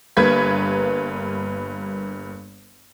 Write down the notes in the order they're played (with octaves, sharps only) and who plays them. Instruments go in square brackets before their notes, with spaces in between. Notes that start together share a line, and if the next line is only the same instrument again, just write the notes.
[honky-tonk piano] G1 G2 A#3 B4 G#6 B6